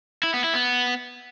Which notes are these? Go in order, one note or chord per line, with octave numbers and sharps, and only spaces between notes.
E4
B3
E4
B3